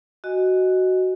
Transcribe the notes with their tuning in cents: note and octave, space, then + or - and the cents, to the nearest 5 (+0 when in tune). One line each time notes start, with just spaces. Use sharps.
F#4 +10 D#5 +0 G#5 -5